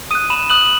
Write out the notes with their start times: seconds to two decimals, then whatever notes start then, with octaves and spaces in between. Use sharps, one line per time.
0.11 D#6 F#6 D#7
0.30 B5 E7
0.50 D#6 F#6 F#7